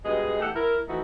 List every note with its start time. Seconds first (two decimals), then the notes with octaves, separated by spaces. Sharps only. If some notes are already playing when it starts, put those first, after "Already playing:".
0.04 G2 B2 G#3 G#4 D#5
0.40 E2 A3 G4 A4 F#5
0.54 E4 A#4
0.87 E3 F3 A3 D#4 F#4 B4